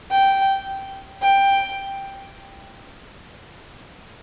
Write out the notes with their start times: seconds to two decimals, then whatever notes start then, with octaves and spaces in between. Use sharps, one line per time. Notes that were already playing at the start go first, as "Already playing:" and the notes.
0.11 G5
1.22 G5